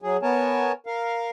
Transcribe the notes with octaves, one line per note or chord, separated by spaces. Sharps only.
F#3 G#4
B3 A#4 C#5 G#5 A5
A#4 F5